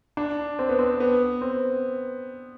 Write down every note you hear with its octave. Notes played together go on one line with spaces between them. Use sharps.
D4
C4
B3
C4
B3
C4